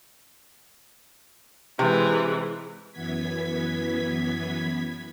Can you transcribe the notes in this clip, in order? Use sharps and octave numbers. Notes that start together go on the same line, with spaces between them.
C3 E3 G#3
F#2 E3 B3 G#6 B6